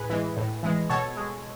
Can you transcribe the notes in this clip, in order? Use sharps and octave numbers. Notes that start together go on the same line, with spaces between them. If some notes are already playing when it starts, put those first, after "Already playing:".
Already playing: A2 G#4 B4
E3 G#3
A2
E3 G#3
B2 A4 C#5
G#3